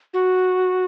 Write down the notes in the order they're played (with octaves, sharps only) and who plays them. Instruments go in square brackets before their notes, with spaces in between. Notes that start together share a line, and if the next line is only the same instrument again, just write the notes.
[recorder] F#4